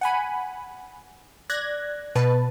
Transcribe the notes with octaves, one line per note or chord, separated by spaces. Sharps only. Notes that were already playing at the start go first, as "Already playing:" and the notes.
F#5 G#5 B5
D5 F#6 G#6 A#6
B2 B4 A5